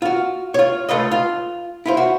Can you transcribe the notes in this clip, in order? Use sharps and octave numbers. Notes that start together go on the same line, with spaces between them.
F4 F#4
F4 C#5
C#2 C#3 A3 F4 B4 D#5
F4
E4 F4 C5
F#4